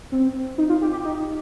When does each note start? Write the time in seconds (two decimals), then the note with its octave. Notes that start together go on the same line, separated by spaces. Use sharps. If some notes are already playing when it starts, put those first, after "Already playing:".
0.12 C4
0.58 D#4
0.69 F4
0.82 G4
0.92 G4
1.05 D#4